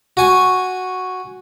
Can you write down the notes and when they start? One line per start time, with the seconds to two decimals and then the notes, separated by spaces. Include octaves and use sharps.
0.17 F#4 G#5 C#6